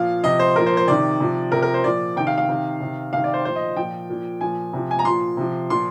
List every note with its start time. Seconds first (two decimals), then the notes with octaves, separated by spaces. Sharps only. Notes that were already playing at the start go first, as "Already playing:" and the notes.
Already playing: A#2 F3 F5
0.23 C3 F3 D#5
0.39 C5
0.56 A#2 F3 A#4
0.66 C5
0.77 C5
0.87 C3 D#3 D5
1.20 C3 F3
1.52 C3 F3 A#4
1.62 A#4
1.74 C5
1.84 A#2 F3 D5
2.16 C3 D#3 G5
2.27 F5
2.38 F5
2.49 C3 D#3
2.80 C3 D#3
3.13 C3 D#3 F5
3.24 D5
3.34 C5
3.45 A#2 F3 C5
3.56 D#5
3.76 F3 G5
3.82 A#2
4.09 A#2 F3
4.41 A#2 F3 G#5
4.73 C3 F3
4.91 G#5
4.99 A#5
5.05 A#2 F3 C6
5.37 C3 F3
5.70 A#2 F3 C6